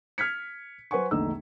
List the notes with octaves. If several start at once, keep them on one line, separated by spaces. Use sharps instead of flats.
F6 G#6 B6 C#7
F#3 B4 C5 F#5 G#5 C#6
A#1 E2 D3 A3 D#4 E6